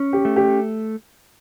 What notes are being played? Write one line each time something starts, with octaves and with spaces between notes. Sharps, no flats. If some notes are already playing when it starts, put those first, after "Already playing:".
Already playing: C#4
G4
A3
G4